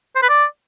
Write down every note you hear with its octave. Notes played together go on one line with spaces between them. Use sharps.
C5
B4
D5